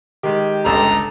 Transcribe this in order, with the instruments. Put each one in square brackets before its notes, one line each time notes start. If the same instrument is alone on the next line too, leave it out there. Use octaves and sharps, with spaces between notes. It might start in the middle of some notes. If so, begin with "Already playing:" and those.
[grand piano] D#3 G#3 [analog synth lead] G4
[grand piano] G1 C#2 C#3 [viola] A4 [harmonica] A#5